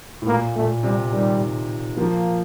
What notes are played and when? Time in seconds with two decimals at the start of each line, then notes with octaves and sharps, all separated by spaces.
0.22 A2
0.27 A#2 A#3
0.55 A#2 A3
0.83 C3 G3
1.12 D#3 G3
1.97 F3 A#3